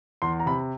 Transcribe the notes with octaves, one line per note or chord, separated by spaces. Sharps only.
E2 C6
A#5
C3 B5